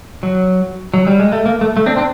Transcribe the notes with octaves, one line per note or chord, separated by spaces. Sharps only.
F#3
F#3
G3
G#3
A3
A#3
A3
A3
C4 D4
C4 D4